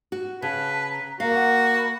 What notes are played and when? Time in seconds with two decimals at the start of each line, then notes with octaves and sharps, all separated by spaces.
0.12 F#4
0.42 C#3 B4 A5
0.91 A#5
1.20 A#3 F#4 F5 A#5
1.35 F#5
1.77 B5